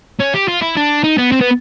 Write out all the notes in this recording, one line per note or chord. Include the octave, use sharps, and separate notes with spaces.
C#4
G4
F4
E4
D4
D#4
B3
C4
B3